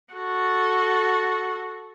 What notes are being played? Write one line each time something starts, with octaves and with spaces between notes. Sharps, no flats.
F#4 A4